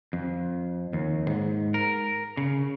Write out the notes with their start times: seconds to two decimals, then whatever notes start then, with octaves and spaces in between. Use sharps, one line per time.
0.13 F2
0.93 D#2
1.28 G#2
1.74 A#4
2.37 C#3